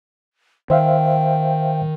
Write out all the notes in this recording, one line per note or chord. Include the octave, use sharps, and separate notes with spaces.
D#3 C5 E5 F5 G5